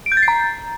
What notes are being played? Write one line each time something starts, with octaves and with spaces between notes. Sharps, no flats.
D7
G6
A6
C7
A#5